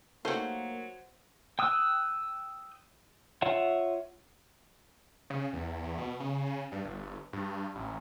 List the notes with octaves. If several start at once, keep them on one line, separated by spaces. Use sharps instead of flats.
F#3 A3 A#3 D#4 G4 C5 F#5
G5 D#6 E6 F#6
F4 C#5 E5 F#5
C#3
E2
E2
B2
C#3
G2
G1
G2
A1